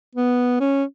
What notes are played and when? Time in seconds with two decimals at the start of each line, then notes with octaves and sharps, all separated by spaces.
0.15 B3
0.60 C#4